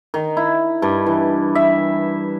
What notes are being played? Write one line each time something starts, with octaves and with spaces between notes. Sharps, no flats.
D#3
E4
G2
E3
E5